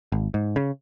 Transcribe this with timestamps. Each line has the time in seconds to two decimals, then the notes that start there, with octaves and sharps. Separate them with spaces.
0.12 G#1
0.34 G#2
0.56 C#3